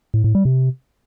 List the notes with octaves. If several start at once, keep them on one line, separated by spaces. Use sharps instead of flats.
A2
A2
G3
C3